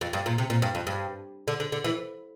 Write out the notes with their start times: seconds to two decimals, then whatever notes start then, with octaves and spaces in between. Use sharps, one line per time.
0.01 F2
0.13 G2
0.26 A#2
0.38 C3
0.50 A#2
0.62 G2
0.75 F2
0.87 G2
1.48 D3
1.60 D3
1.72 D3
1.84 E3